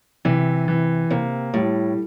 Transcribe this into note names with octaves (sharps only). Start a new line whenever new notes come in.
C3 E3
E3
C3 A#3
A2 G3